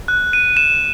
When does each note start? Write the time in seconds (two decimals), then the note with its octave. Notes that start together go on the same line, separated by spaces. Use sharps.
0.08 F#6
0.33 D#7
0.57 E7